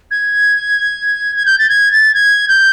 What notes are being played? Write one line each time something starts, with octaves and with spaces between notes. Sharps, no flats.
G#6
G#6
G6
A6
G#6
A6
G#6
G6